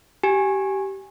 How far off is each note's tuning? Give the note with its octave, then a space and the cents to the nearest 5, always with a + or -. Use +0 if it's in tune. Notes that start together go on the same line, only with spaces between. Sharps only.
G4 -20 G#5 +0